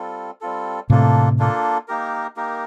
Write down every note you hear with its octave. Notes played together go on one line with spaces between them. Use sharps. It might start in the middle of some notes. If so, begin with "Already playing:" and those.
Already playing: G3 C4 F4 A4
G3 C4 F4 A4
A2 C3 A#3 D4 F4 A4
A#3 D4 F4 A4
A#3 D#4 G4 A#4
A#3 D#4 G4 A#4